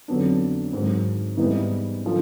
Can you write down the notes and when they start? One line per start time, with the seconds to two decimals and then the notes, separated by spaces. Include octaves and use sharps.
0.08 F2 D3 F#3 B3 D4
0.73 G#2 D#3 F#3
1.37 G#2 E3 G3 B3 D#4
2.05 D3 F3